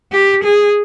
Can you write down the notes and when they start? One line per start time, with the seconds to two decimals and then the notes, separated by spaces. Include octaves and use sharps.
0.12 G4
0.44 G#4